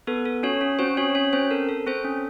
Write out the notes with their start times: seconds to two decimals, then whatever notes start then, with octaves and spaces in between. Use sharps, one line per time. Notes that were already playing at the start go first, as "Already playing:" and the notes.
0.07 B3 A4 B4
0.25 A4
0.43 C#4 F#4 C#5
0.61 C#4
0.79 C4 F#4 C5
0.97 C#4 F#4 C#5
1.15 C#4 C#5
1.33 C4 C#4 C5
1.51 A4 A#4
1.69 A4
1.86 C4 A4 C5
2.05 C#4